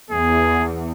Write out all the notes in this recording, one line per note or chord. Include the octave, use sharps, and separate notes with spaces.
E2 G#4